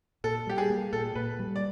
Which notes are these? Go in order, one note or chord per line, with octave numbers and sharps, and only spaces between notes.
A#2 A4
G3 G4
G#4
A#3
A#2 A4
A#2 B4
G3
D5